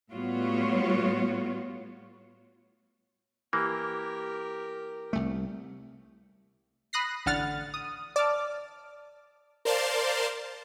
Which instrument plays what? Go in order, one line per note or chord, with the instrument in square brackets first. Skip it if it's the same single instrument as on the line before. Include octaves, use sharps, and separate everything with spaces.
[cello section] A2 G3 B3 F4 F#4 C#5
[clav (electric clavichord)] E3 A#3 [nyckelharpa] G4 A#4
[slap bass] C2 A3
[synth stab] B5 D#6 F#6 A#6 C7
A1 D3 F#5 F6 A6
D#6
D5 A5 D6 F6
[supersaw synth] A#4 C5 D5 F5 A5 C6